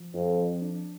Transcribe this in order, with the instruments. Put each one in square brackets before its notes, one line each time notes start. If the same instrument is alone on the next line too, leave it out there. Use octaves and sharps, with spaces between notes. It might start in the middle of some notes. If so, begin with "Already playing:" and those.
Already playing: [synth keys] F3
[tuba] F2 [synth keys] C4
[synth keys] F3
D4